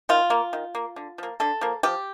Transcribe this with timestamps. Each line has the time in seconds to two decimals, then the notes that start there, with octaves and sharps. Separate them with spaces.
0.09 D#3 F4
0.30 A#3
0.53 D#3
0.75 A#3
0.96 D3
1.18 F3 A#3
1.40 D3 A4
1.61 F3 A#3
1.83 F3 G4